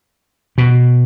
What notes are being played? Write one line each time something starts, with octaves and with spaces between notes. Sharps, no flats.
B2